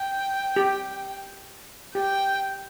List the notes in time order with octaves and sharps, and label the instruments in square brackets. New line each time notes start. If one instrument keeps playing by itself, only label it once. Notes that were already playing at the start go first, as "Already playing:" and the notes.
Already playing: [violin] G5
[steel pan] G4
[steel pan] G4 [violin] G5